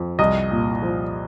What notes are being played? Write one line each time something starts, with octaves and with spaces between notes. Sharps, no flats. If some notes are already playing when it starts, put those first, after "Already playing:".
Already playing: F2
C2 D#5
A#2
F3